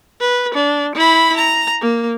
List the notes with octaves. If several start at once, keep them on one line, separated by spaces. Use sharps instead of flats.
B4
D4
E4 B5
A#5
A#3